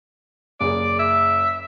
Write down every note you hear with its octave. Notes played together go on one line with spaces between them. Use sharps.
F#1 G#4 D5
E5